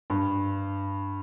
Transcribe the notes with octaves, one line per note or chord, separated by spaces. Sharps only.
G2